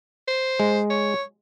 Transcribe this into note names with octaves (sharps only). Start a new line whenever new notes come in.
C5
G#3
C#5